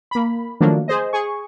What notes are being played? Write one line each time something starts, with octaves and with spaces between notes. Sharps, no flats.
A#3 B5
D#3 F3 F#3 A3 A#3 D4
G#4 C5 D#5
G#4 C#6